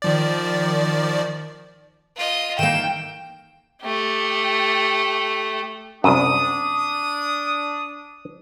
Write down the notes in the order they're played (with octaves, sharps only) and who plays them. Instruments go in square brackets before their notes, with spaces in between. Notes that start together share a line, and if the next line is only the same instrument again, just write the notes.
[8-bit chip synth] D#3 F3 D5
[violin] F4 D#5
[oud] D#3 E3 A#3 [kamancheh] G5 [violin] E7
[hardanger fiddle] A3 G4
[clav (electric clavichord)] C2 F#2 [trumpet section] D4 D#6